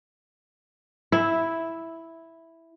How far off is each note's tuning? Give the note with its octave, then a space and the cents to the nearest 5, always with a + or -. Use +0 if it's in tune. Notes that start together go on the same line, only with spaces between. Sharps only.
E4 +0 E5 -10